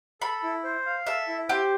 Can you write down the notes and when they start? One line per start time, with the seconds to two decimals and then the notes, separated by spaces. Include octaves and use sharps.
0.21 A4 B5
0.43 E4
0.63 C5
0.86 F5
1.07 A4 E5
1.27 E4
1.49 G4 C5